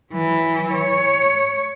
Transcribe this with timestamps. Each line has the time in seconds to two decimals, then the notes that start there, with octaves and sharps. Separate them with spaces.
0.11 E3 F#3
0.73 C#5